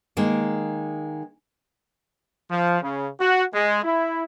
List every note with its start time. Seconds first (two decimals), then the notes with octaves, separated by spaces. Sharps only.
0.17 D#3 G#3 A#3 A#4
2.49 F3
2.82 C#3
3.19 F#4
3.52 G#3
3.83 E4